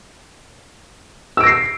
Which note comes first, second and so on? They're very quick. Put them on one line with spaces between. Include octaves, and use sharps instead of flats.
E6 D7 A#6 C7